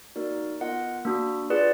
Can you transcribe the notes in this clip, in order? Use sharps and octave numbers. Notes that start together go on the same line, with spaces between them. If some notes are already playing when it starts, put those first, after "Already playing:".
A#3 D#4 F#4 A#4 D5
B3 F4 A#4 D#5 F#5
A#3 D4 F#4
F4 G#4 B4 D5 F#5